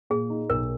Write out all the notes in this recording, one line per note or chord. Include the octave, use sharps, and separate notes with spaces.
A#2 G#4
D#4
B1 A#4